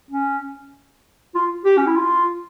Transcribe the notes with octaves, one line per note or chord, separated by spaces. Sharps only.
C#4
F4
G4
C#4
E4
F4